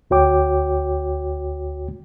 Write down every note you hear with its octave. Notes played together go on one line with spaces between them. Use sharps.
D2 F#4 C#5 G5 D6